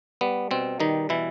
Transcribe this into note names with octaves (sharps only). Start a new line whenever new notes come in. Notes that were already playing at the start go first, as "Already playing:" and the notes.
G3 B3
B2 C4
D#3 G3 D#4
B2 E3 E4